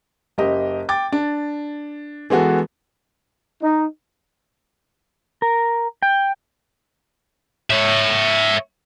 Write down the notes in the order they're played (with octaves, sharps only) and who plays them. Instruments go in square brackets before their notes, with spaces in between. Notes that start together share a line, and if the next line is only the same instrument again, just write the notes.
[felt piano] F#1 G4 D#5
G5 D6 A6
D4
E3 G#3 B3 F#4 A4
[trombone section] D#4
[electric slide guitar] A#4
G5
[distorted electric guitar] C#5 E5